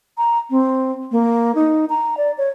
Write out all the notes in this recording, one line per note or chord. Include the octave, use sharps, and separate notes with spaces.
A#5
C4
A#3
D#4
A#5
D5
C#5